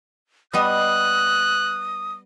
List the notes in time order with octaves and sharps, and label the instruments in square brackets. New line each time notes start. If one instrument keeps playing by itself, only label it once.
[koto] G3 B3 D#5 [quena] D#6 [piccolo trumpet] F#6